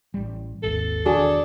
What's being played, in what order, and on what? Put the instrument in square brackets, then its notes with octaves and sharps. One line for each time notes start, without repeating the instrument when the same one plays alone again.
[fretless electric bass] A1 G3
[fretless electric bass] G#1 D#2 [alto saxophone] A4
[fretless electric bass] E1 D#3 [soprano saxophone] D4 [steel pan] F#4 G#4